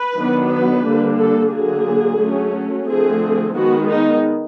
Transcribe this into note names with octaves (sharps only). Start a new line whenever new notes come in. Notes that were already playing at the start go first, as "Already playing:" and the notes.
Already playing: B4
D#3 F#3 B3 D4
B4
D3 G3 A#3 D4
A4
D3 F#3 A#3 G#4
F#3 A3 C#4
D3 F3 A3 C4 G#4
D#3 G#3 B3 F#4
D#4